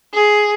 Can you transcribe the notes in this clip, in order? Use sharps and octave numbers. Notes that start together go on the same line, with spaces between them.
G#4